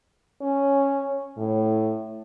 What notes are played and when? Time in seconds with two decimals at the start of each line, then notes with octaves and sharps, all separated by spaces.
0.42 C#4
1.38 A2